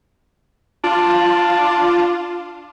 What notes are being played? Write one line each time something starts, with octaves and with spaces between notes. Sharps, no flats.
D4 F4